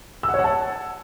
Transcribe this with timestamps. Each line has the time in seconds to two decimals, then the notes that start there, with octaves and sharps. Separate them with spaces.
0.23 E6
0.29 F#5
0.34 C#5
0.39 F#5
0.44 A5